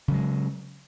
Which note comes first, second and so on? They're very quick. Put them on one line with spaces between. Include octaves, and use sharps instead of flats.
C#3 F#3 G#3